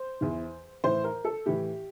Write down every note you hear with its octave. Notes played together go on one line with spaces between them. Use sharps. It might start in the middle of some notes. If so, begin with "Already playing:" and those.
Already playing: C5
E2 E3
A2 E3 C5
A#4
A4
A2 E3 G4